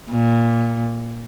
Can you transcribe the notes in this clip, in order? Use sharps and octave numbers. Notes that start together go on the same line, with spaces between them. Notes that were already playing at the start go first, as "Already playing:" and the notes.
A#2